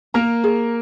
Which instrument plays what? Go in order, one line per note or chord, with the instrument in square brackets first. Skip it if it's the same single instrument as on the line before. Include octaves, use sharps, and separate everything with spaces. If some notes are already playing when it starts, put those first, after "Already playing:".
[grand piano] A#3 A#4 [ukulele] A#5
[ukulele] G#4